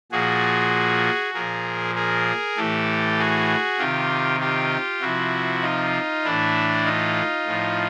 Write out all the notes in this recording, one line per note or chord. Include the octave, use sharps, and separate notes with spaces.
A#2 F3 F#4 G#4
A#2 F3 G#4 A#4
G#4 A#4
A2 E3 G4 A4
F#4 G#4
C3 D#3 F4 G4
F4 G4
C3 F3 E4 F#4
D#4 F4
A2 E3 D4 E4
D#4 F4
A2 F3